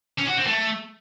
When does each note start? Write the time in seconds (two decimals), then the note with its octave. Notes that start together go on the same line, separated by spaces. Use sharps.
0.18 C#4
0.27 F#4
0.37 C4
0.46 A3